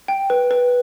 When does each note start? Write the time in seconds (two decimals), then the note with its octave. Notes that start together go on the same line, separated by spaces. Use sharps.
0.08 G5
0.30 B4
0.51 B4